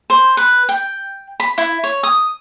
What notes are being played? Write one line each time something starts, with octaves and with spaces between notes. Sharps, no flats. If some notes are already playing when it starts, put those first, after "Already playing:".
C5
B4
G5
B5
E4
C#5
D#6